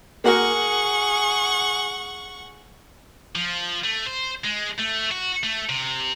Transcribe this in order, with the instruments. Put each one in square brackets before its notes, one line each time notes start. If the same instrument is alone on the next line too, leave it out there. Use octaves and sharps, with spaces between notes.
[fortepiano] A#3 F#4 A#4 [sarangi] G#4 [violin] F#5 C#6
[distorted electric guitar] F3
A3
C5
G#3
A3
F#4
A3
C3